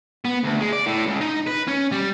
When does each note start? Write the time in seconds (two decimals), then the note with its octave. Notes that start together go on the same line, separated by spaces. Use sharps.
0.25 B3
0.43 D2
0.60 G#3
0.72 D5
0.86 A2
1.06 C#2
1.21 D#4
1.46 B4
1.67 C#4
1.92 G3